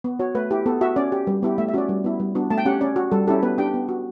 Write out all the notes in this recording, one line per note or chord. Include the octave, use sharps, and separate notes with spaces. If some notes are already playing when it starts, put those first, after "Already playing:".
B3
F#4 C#5
A3 B4
E4 G4
B3 A4
F#4 E5
C#4 D5
G4
G3
B3 E4 G4
A3 E5
E5
C#4 F#4 D5
G3
B3 E4
G3
B3 D4 F#4
A3 A5
G5
C#4 G4 F#5
C#4 D5
F#4
G3 A4
C#4 E4 G4 A4
B3 B4
D4 G4 G5
B3
F#4